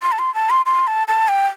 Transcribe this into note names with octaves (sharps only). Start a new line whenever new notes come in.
C6
A5
C6
A5
C6
C6
A5
A5
G5